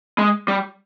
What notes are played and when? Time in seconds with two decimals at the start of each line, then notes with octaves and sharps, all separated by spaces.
0.18 G#3
0.48 G3